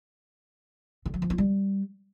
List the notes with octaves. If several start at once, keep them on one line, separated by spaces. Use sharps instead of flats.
D3
F#3
F3
F4
G3